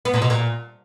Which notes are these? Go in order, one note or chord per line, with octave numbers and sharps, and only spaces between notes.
B3
A#2
B2
A#2